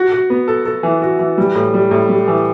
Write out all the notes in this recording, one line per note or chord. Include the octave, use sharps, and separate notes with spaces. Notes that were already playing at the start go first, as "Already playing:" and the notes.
Already playing: F#4
F#4
B3
A4
A4
E3
F#4
E3
G3
A2
G3
A2
G3
E3